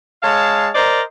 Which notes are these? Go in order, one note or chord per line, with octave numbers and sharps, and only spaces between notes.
G#3 C#5 F5 A5
A#4 C5 D5 D#5 A#5